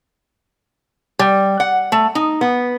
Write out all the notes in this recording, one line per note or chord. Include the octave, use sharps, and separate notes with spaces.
G3
F#5
A3
D#4
B3